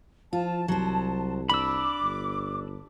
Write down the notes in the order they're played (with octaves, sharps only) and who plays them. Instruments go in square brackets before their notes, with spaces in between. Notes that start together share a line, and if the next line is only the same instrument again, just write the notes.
[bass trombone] F3 [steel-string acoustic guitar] F4 [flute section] A5
[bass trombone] C2 [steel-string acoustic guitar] F#3 C5
[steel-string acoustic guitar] D4 [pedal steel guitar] B5 E6 [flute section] D6
[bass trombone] G1